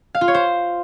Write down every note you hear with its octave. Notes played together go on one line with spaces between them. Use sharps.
F5
F4
C#5
C5